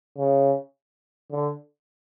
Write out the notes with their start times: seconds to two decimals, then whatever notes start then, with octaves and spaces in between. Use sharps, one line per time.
0.18 C#3
1.32 D3